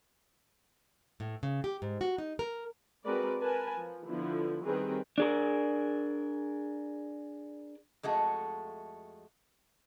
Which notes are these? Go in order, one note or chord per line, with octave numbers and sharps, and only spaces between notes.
A2
C#3
G4
G#2
F#4
D#4
A#4
G#3 C4 F#4 A#4 B4 D5
A#4 B4 G#5 A5
F3
D3 F3 B3 E4
D#3 G3 C4 G#4 A#4 B4
D4 G#4 A#4
F2 G#3 A3 F#4